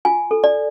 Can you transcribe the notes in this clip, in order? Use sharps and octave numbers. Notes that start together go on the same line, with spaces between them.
F4 G#5
A4
D5